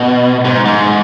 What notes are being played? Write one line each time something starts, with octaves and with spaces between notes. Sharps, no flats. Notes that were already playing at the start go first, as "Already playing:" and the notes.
Already playing: B2
G#2
G#2